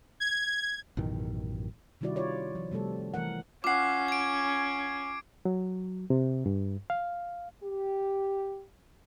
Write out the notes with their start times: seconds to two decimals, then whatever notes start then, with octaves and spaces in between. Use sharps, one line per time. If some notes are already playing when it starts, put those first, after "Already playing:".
0.20 G#6
0.97 A1 F#2 B2 D#3
2.01 C3 D#3 G3 E4 F#4 D5
2.16 F4 C#5 D5
2.55 F3
2.71 C3 G3 A3 A4
3.14 E3 A3 A#4 F#5
3.64 C#4 F4 F#5 D6 C7
4.08 G#6 D7
5.45 F#3
6.10 C3
6.46 G2
6.90 F5
7.63 G4